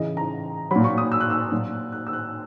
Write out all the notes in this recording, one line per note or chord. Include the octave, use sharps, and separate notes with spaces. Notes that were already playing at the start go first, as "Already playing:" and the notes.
Already playing: C#3 E3 D#5
A#5
A#2 F#3 B5
C#6
D#6
E6
F#6
E6
A#2 F#3
F#6
E6
F#6